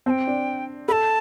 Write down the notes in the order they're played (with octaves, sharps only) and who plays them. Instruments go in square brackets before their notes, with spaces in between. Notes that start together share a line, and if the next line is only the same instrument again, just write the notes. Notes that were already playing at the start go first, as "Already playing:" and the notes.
[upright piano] C4 [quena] A5
[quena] G5
[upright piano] D4
[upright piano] A4 [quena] A5 B5